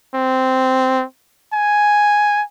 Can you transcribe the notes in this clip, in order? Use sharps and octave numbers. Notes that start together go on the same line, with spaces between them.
C4
G#5